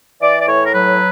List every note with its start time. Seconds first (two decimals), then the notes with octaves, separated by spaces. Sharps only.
0.21 E3 D5
0.40 D5
0.47 A2 C#5
0.65 A#4
0.73 F#3 B4